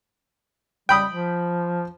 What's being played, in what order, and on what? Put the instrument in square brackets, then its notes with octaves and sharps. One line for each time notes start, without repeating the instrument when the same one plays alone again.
[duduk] G3 [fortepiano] G5 B5 D#6
[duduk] F3